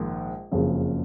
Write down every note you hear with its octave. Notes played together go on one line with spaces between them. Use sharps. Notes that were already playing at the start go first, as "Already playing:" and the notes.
Already playing: A#1 G#2 D#3 G#3
F#1 F2 C#3